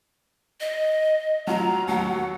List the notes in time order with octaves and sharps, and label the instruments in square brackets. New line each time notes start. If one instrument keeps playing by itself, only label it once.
[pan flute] D#5
[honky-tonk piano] F#3 F4 [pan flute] A#5
[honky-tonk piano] D#2 F#3 [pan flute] F#5